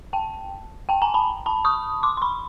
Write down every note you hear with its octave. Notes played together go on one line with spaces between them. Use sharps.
G5 A5
G5 A5
G#5 A#5
A5 B5
A5 B5
C#6 D#6
C6 D6
C6
B5 C#6